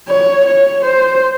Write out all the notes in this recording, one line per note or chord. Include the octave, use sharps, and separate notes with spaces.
C#5
C#5
C5